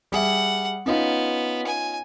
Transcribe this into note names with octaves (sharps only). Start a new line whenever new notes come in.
G3 G#4 E5 F#5
B3 C#4 D#4 F4
G#5